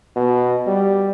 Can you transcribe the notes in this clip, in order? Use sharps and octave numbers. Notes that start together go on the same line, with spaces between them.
B2
G3